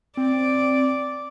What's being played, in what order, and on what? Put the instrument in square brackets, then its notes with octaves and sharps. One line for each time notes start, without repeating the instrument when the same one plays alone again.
[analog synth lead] C4 [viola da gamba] D5